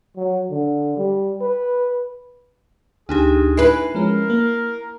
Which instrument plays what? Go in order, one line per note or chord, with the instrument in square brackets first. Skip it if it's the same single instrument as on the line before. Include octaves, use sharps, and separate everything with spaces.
[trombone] F#3
D3
G3
B4
[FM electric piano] D2 [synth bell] D4 D#4 G4 [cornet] G#4
[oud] E4 B4 [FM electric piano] G#5 [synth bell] C7
[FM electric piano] F3 G#3 C#4 [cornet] A#4
[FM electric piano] A#3